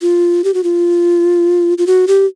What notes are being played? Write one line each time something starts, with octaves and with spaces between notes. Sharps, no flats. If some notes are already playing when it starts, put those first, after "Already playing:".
F4
G4
F#4
F4
F4
F#4
G4